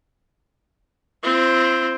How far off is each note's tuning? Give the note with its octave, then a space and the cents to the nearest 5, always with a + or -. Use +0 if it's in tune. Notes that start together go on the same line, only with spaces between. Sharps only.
C4 +0 F4 -45